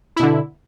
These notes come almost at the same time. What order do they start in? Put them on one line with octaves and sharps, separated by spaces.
E4 B2 D3